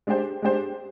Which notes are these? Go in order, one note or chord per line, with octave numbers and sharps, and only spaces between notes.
G#3 D4 G4 C5
G#3 D4 G4 C5